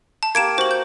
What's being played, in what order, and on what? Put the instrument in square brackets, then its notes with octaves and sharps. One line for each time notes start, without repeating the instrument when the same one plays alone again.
[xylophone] A5
[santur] A#3 G4 [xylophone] G#6 D7 E7
[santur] F#4 [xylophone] C5 F#7
[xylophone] G6